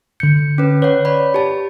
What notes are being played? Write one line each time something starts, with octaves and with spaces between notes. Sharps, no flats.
D3 G6 C#7
C#4 B4
B4 C#5 F#5
C#5 D5 B5
G4 A5